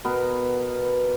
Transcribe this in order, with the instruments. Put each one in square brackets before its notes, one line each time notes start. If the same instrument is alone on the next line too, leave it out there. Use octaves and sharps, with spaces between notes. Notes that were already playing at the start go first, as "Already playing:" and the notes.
[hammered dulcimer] B2 B3 A#4